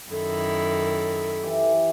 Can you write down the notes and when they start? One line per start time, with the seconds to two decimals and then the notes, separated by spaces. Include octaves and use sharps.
0.11 F#2 D#3 E4 A4
1.43 E3 E4 G4